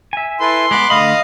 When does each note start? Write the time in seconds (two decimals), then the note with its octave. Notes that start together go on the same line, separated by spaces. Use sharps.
0.13 E5 G#5
0.41 E4 A4 B4 C6
0.71 G#3 B3 B5 D6 F#6
0.90 D3 A3 D#5 F5 B5 D#6